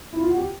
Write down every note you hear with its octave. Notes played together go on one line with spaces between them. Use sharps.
E4
F4
F#4
G4